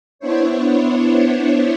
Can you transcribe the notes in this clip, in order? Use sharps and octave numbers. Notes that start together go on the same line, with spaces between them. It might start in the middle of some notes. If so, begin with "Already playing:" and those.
B3 D4 E4 C5 C#5